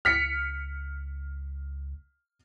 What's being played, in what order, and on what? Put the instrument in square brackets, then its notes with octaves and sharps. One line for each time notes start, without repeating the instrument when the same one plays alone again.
[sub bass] C#2 [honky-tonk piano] F6 B6 C#7